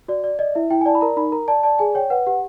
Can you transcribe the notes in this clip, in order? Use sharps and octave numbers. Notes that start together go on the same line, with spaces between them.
F#4 D5
D5
D5 D#5
E4 E5
E4 G5
G#5
D5 A5
B5
A#4 A#5
D#4 B5
A#4 A#5
D5 A5
D5 A5
G#4 G#5
C#5 G5
B4 F#5
G4 F#5